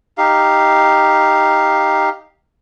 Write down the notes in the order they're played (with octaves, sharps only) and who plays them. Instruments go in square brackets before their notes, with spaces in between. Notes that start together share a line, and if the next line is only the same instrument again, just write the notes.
[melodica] D#4 G4 F5